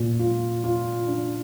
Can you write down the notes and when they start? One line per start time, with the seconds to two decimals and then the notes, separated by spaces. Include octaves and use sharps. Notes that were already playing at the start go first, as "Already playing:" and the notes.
Already playing: A#2
0.19 F4
0.64 F4
1.07 D4